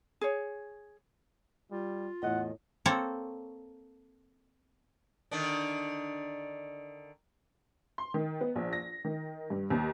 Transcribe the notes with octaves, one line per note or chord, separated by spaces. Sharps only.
G#4 C#5
G3 F4
E2 A2 D#5 F#5
A#3 C4 A4 C#5
D3 D#3 D4
C6
D#3
B3
A#1
A#6
D#3
G2
D#2